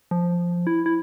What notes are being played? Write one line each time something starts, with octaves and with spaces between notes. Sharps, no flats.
F3
E4
E4